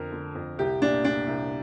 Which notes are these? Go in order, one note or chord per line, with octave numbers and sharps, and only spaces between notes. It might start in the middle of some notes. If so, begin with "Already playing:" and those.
Already playing: F2 D3 A#4
D3
F2
C2 G4
A#2 D4
A#2 D4
C2